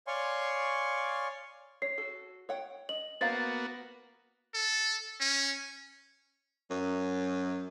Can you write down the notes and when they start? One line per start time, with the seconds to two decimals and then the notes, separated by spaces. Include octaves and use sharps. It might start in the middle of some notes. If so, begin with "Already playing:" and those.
0.07 C#5 D5 F5 G#5 C6 C#6
1.82 C#5 C7
1.98 F#4 A4
2.49 C#5 F#5 G5
2.89 D#5 F#7
3.21 A#3 B3 F#4 C5 F5 A#5 A6
4.54 A4
5.20 C#4
6.71 F#2